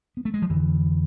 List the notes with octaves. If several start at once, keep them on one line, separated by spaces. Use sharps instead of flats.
B3
A3
G#3
F3
F2 D3 E3